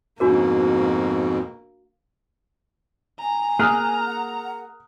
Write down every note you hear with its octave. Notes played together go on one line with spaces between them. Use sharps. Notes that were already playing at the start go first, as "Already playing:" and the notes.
F2 G#2 B2 A#3 D4 F#4 A#4
G#5 A#5
A#3 G#4 D#6 F6 F#6
F#5